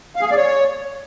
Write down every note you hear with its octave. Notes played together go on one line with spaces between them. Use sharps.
F5
G#4
F5
D5
C#5